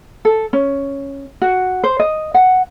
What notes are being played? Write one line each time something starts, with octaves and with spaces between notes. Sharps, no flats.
A4
C#4
F#4
C5
D#5
F#5